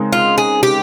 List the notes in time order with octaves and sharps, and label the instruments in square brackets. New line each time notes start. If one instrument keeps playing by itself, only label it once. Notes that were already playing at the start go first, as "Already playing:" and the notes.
Already playing: [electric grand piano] C#3 G#3 C4 D#4 A#4
[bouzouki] F4
G#4
G4